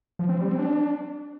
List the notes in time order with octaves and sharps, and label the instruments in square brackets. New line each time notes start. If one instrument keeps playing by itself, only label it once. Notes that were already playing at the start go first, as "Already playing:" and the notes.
[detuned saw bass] F3
C4
G3
C4
D4